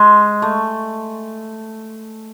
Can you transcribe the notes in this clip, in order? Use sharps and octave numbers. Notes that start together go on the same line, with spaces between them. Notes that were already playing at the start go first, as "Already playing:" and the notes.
Already playing: G#3
A3